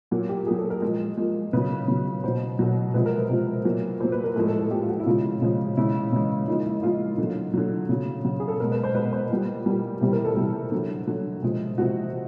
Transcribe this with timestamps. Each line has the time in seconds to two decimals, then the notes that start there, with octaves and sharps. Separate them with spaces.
0.11 A#2 F#3 F#4
0.29 G4
0.47 A#2 G#4
0.51 F#3
0.59 A4
0.70 A#4
0.82 A#2 F3 G#3
1.17 A#2 F3 G#3
1.53 C#3 F#3 B4
1.88 C#3 F#3
2.23 B2 F#3 C5
2.59 B2 F#3
2.94 C3 F3 G#3 B4
3.06 A#4
3.18 B4
3.30 C3 F3 G#3
3.65 A#2 F#3
4.00 A#2 C5
4.04 F#3
4.12 B4
4.24 A#4
4.36 A2 F3 G#3 A4
4.47 A4
4.59 A4
4.71 A2 F3 G#3 G4
4.83 F4
4.89 F#4
4.99 E4
5.06 C#3 F3 G#3 F4
5.42 C#3 F3 G#3
5.77 C#3 E3 G#3 E4
6.12 C#3 E3 G#3
6.48 A#2 F3 G#3 D#4
6.66 E4
6.78 E4
6.83 A#2 F3 G#3 F4
7.18 D3 F#3
7.54 D3 F#3
7.89 C#3 F#3
8.24 C#3 F#3 F#4
8.40 G#4
8.48 A4
8.60 B2 A#4
8.64 G#3
8.72 B4
8.83 C5
8.95 B2 G#3 B4
9.13 C5
9.30 A#2 G3 B4
9.66 A#2 G3
10.01 C3 E3 G3
10.13 A#4
10.25 A4
10.37 C3 E3 G3
10.72 D3 F#3
11.07 D3 F#3
11.43 C3 F3 G#3
11.78 C3 F3 G#3 F#4